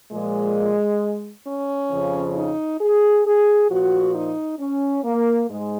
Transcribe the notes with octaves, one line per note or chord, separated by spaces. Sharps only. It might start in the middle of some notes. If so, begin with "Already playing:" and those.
A#2 F3 G#3
C#4
F2 C#3 F3
D#4
G#4
G#4
A#2 F3 F#4
D#4
C#4
A#3
G#2 G#3